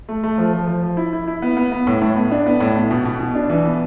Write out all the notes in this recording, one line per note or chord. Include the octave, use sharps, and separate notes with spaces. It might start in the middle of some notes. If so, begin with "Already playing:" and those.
A3
A3
F3
F3
F3
F3
E4
E4
E4
B3
B3
B3
A2
A2
B3
D4
B3
A2
B3
B2
B2
B2
D4
E3
B3